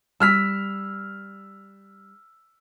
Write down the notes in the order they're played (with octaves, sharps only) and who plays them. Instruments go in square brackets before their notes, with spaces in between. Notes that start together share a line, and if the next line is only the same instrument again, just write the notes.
[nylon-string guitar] G3 [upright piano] E6 F6 B6